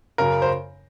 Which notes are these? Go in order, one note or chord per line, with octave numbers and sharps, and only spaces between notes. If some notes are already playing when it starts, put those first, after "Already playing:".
F#2 C#3 A#4
C5